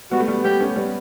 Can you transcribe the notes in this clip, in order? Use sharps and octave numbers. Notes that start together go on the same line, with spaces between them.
G3 B3 F#4
A3
G3 B3
G3 B3 G4
A3 C#4
G3 B3